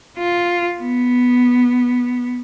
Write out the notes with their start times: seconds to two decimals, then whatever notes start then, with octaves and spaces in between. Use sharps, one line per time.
0.18 F4
0.79 B3